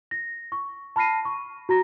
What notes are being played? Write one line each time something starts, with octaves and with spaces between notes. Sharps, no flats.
A#6
C#6
A5 B5 F6 A#6 C7 D#7
C#6
F#4 A#5 A#6